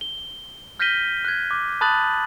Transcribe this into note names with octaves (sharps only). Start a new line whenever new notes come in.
G7
F6 G6 A#6 B6 D#7 G7
F#6 G#6
D6
A5 B5 D#6 F#6 A6 F#7